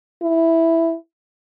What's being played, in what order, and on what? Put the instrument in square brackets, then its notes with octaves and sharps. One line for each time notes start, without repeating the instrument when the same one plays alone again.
[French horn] E4